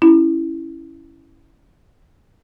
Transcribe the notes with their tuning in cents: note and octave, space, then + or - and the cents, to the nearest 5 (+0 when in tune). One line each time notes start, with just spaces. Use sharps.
C#4 +0 E4 +0